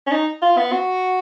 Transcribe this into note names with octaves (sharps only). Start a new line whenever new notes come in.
C#4
D#4
F4
B3
F#4